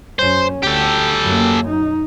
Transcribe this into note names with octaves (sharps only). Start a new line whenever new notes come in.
F#2 C#4 C5
D2 G4 A4
F#2 A#3
D#4